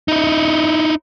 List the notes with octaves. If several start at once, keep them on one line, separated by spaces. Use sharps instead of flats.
D#4 E4